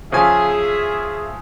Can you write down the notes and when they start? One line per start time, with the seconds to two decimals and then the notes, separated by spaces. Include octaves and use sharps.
0.12 C#3 F3 G#4 E5 G#5